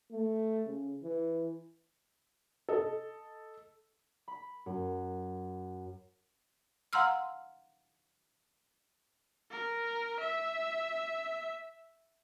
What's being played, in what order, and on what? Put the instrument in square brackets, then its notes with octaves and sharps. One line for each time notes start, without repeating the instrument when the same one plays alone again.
[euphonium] A3
C#3
E3
[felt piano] A4 D#5
[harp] B5
F#2
[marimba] F5 F#5 A#5 C6 E6 F6
[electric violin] A#4
E5